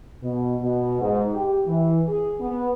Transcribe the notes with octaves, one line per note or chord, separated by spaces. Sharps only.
B2
B2
G#2
G4
E3
G#4
B3